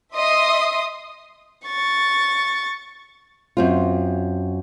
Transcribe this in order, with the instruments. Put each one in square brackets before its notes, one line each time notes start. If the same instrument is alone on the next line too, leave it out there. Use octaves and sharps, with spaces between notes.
[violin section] D#5 E5 C6 D#6
[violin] C#6 A6
[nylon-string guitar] F#2 C4 F4